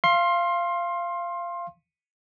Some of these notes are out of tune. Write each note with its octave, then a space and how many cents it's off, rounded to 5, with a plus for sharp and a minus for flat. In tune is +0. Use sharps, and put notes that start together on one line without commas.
F5 -20 C6 +20